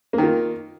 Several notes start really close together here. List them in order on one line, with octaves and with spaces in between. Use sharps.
A#3 D#3 F4